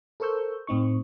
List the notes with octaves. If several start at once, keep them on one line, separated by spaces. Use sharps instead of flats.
A4 A#4 C5 C#6 E6 G6
A2 C4 D#4 C#6